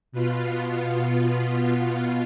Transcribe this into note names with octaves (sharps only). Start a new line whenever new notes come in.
B2 B3 F4